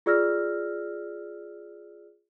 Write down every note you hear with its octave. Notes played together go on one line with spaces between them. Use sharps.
F4 G#4 D5 E6 F6 A#6